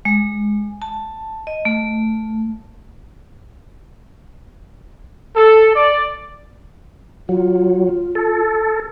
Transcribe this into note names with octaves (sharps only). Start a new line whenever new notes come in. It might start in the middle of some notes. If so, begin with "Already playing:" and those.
G#3
A5
D#5
A3
A4
D5
F#3 F4
A4